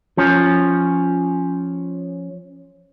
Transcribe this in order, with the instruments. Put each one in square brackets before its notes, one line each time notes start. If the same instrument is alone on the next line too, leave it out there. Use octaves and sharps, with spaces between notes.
[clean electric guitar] F3 C#4